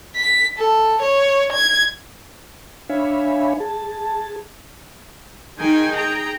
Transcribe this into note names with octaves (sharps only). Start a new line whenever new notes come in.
B6
A4
C#5
G#6
D4 C#5 E5 F5 G#5 B5
G#4 A5
D#3 D#4 G#4 G5 G#5
G#4 G5 A#5